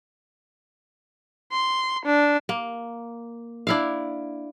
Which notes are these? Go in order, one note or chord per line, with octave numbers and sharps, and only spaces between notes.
C6
D4
A#3
D4 E4 F5